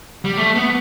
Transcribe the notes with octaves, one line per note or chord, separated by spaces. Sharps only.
G3
A3
B3